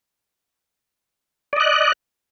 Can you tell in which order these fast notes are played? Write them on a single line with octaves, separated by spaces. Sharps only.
D5 D#5 F#6